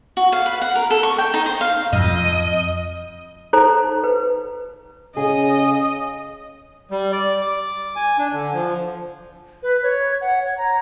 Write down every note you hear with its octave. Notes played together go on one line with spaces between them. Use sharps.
F#4
F5
B4
F#5
A#4
A4
C#6
G5
D#4
C5
F5
F2 D#5
D#4 A4 C5 A#5
B4
C#3 G#4 D#5
G3
D5
D6
G#5
D4
D3
F3
B4
C#5
F#5
C#5
A#5